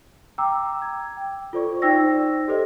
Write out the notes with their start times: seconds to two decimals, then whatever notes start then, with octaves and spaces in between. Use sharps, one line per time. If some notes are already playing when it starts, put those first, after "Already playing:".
0.38 G5 A#5 D6 E6
0.82 G#6
1.17 G5
1.53 F4 A4 C5 D5 C#6
1.82 D#4 C5 D5 G5 E6 A#6
2.48 G4 A4 C5 D#5